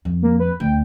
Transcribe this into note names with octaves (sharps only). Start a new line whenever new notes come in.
F2
A#3
B4
D2 G5